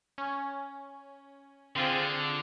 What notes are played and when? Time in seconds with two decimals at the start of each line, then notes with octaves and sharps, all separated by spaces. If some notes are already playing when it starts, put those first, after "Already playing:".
0.18 C#4
1.76 D3 C4 F4 G#4